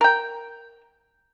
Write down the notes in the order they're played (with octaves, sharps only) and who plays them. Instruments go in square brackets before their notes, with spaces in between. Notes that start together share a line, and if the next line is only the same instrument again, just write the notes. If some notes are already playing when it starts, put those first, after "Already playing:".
[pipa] A#4 G5